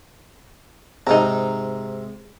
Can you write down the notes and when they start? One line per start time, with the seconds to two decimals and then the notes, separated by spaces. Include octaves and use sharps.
1.07 G#2 C3 D#4 A#5